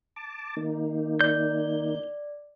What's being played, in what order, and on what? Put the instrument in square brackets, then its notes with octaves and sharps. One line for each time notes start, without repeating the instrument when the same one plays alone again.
[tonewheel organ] A5 D6
D#3 A#3 D#4
[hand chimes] D5 [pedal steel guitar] G6